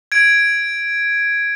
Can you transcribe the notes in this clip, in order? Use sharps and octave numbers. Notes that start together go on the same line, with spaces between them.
G#6 D7